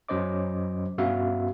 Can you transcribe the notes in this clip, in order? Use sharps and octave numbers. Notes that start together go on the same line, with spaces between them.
F#2 F#3 C#4 C5 D#5 D6
G2 B3 C#4 F#4 E5 F5